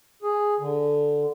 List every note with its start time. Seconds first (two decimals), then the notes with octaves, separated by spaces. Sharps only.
0.22 G#4
0.59 D3